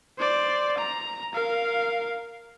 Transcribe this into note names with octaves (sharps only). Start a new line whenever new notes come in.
C5 D5
A#5
A#4 F5